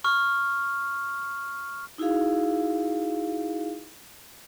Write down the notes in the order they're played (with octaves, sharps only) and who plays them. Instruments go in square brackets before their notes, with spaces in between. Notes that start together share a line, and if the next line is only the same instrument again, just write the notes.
[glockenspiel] C#6 F6
[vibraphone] D#4 E4 F#4 G#4 F5